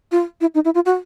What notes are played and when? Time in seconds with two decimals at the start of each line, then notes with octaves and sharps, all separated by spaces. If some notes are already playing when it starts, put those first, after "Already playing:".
0.12 F4
0.41 E4
0.55 D#4
0.65 E4
0.75 F4
0.86 F#4